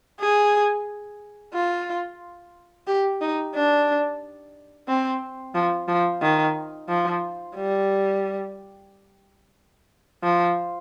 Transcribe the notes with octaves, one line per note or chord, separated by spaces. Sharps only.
G#4
F4
G4
D#4
D4
C4
F3
F3
D#3
F3
G3
F3